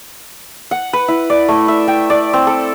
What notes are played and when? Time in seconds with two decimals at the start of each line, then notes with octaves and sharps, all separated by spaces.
0.71 F#5
0.93 B4
1.08 E4
1.30 D5
1.48 A3
1.68 E5
1.88 G5
2.10 D5
2.33 C4
2.47 A4